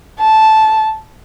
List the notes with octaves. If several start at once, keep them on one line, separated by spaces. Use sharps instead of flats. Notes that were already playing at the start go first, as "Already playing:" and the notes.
A5